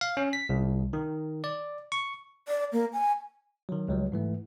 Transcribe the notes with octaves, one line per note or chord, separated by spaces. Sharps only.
F5
C#4
B6
C2
D#3
D5
C#6
D5
A#3
G#5
D#3 F#3
C#2 F#3 G3
G#2 E3 A3